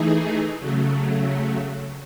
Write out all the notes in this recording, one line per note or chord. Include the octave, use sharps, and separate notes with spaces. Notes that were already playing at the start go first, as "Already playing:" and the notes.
Already playing: E3 A3 D#4 G#4
C#3 F#3 A3